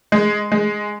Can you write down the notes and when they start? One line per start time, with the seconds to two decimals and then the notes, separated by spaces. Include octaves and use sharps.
0.12 G#3
0.52 G#3